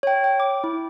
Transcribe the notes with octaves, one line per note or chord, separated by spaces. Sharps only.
C#5 G5
G5
D6
E4